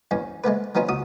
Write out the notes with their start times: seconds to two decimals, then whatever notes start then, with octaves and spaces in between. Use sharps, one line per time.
0.11 E2 G2 C#4
0.44 G#3 A3 B3 B4
0.75 F#3 B3 C#4 D#4 F4
0.89 C#2 F#4 D#6